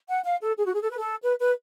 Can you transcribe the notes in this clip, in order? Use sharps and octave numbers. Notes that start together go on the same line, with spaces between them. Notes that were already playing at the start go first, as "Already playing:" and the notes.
F#5
F5
A4
G#4
F#4
G#4
A4
B4
A4
B4
B4